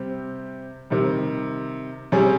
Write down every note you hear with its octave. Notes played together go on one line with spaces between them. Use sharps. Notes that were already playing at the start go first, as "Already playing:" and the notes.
Already playing: C3 G3 C4 G4
C3 D#3 G3
C3 G3 C#4 G#4 C#5